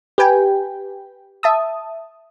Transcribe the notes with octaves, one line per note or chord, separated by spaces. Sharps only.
G4 B4 G5 G#5
E5 A5 D#6